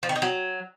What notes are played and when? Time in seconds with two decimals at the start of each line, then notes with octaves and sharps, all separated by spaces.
0.03 F3
0.09 D#3
0.16 D#4
0.22 F#3